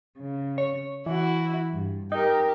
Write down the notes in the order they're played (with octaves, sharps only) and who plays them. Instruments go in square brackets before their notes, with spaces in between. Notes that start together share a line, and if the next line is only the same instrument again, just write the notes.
[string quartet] C#3
[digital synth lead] C#5
[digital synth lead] E3 [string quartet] E4 F#4
[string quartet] G2
[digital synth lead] D#4 [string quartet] G4 A#4